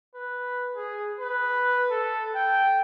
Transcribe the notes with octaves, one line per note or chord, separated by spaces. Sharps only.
B4
G#4
B4
A4
G5